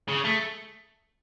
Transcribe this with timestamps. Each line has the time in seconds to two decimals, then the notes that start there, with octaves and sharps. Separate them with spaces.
0.08 C#3
0.24 A3